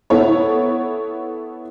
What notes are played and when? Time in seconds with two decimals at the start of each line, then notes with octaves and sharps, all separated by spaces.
0.10 B3 E4 A4 C#5